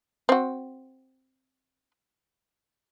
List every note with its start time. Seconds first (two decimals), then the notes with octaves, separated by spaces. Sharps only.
0.29 C4 F#4